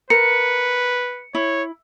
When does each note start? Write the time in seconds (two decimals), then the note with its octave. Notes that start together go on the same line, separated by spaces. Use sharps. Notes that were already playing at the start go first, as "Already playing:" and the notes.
0.10 A#4 B4 C#7
1.35 E4 C#5